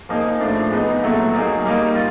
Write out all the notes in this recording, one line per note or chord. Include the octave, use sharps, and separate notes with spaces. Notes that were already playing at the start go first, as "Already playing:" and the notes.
F3 A#3 D#4 G#4
A2 F3 A3 D4 F4
G#3 B3 D#4
A#2 F#3 A3
F#3 A#3 D#4 G#4
G3 A#3 D#4
F4